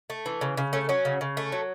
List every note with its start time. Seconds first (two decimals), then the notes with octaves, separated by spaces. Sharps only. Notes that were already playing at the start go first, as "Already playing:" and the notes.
0.10 A3
0.26 E3
0.41 C#3
0.57 C#3
0.73 A3 C#4
0.89 F#3 C#4
1.05 C#3
1.21 C#3
1.37 A3
1.52 F#3